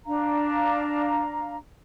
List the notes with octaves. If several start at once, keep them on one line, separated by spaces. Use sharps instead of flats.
D4 F5 A#5